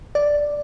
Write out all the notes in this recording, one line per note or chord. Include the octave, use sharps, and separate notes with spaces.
D5